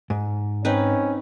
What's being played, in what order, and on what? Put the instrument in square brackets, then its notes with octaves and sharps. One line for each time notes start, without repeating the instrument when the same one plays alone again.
[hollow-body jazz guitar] G#2
[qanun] C4 D#4 B4 [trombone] C#4